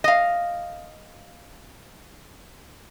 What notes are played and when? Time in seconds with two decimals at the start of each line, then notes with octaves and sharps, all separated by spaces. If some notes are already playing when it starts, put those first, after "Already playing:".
0.04 D#5 F5